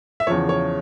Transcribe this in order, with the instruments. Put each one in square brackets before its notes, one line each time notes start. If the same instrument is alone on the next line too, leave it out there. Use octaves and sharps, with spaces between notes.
[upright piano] E5
E2 C#3 F3 C#5
C#5